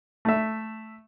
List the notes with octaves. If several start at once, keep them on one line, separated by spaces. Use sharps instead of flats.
A3 E5